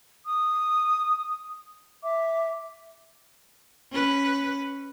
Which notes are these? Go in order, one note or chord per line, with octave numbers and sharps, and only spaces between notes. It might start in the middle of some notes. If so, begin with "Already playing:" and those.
D#6
E5 D6
C#4 B4